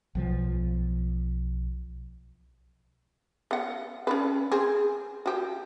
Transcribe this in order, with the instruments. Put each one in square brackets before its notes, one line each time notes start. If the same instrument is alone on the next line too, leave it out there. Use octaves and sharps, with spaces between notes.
[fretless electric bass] B1 F3
[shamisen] B3 F#5
C#4 D4 B4
C4 G#4
F#4 G4